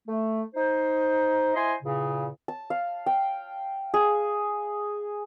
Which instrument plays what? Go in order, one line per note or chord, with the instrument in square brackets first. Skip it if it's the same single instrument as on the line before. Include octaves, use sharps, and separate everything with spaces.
[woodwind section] A3
D#4 C5
E4 C5 D#5 G#5 C6
E2 A#2 C#3
[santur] A5
F5
G5
G#4